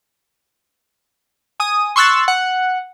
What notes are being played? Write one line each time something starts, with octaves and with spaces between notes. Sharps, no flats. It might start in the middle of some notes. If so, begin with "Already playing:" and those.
G#5 D#6
C6 C#6 E6 F#6 A6
F#5